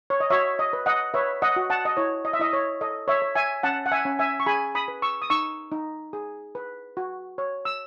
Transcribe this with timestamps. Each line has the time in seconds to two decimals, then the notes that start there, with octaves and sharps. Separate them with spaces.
0.10 C#5
0.20 D#5
0.30 F#4 C#5 E5
0.59 D#5
0.73 B4
0.86 D#5 F#5
1.14 B4 C#5 E5
1.42 D#5 F#5
1.56 F#4
1.70 F#5 A5
1.85 D#5
1.97 E4 C#5
2.25 D#5
2.33 E5
2.40 E4 D#5
2.53 C#5
2.81 A4 D#5
3.08 C#5 E5
3.22 C#5
3.35 E5 G#5
3.63 C#4 F#5 A5
3.86 F#5
3.92 E5 G#5
4.05 C#4
4.19 E5 G#5
4.40 C#6
4.46 G#4 G#5 B5
4.75 B5 D#6
4.88 B4
5.02 C#6 E6
5.22 D#6
5.30 D#4 C#6 E6
5.72 D#4
6.13 G#4
6.55 B4
6.97 F#4
7.38 C#5
7.65 E6